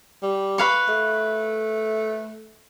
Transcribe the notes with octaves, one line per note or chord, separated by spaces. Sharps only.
G3
B4 F5 C#6
A3